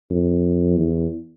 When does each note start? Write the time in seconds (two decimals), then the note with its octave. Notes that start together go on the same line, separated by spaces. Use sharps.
0.10 F2
0.78 E2